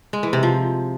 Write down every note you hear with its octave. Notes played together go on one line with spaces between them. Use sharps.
G#3
E3
C3
F3